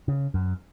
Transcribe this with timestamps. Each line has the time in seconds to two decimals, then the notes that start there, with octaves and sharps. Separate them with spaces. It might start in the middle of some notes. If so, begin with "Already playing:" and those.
0.08 C#3
0.34 F#2